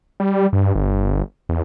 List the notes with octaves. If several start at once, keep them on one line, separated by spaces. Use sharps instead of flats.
G3
G2
G1
E2